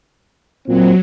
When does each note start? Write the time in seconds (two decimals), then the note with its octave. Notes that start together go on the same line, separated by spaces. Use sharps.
0.68 A#2 F#3 C4